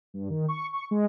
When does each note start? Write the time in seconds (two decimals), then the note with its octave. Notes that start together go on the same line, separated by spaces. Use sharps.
0.14 G2
0.30 D#3
0.48 C#6
0.73 C#6
0.91 G#3